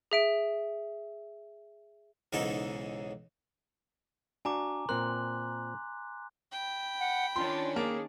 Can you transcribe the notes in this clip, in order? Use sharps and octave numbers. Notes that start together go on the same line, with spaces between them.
G#4 E5 D7
B1 G#2 C#3 E3 D#4 A4
D4 F#4 G#5 A#5 D6
A#2 C4 A#4 C6 F#6
G5 B5
F#5
D#3 C#4 D4 F4 C6
A#3 G#4